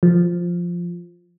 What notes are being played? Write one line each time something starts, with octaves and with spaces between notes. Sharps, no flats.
F3